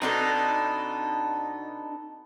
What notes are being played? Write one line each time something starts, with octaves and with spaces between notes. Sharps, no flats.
B2 C4 D4 D#4 A4 A#5